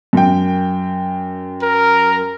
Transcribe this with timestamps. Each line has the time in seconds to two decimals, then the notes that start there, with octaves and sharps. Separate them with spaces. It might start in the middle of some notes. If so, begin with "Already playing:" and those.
0.13 F#2 G5
1.62 A#4